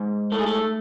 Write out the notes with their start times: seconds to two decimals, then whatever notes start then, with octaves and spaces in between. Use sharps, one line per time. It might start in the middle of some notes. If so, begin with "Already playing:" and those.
Already playing: G#2
0.32 A3 A4
0.39 G#4
0.46 A4